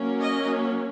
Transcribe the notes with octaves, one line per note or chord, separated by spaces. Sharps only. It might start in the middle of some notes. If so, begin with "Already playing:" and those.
Already playing: F#3 A#3 C#4
D#5